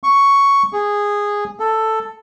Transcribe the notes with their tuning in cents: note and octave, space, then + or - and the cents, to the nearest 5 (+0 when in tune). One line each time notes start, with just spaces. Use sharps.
C#6 +5
G#4 -10
A4 +5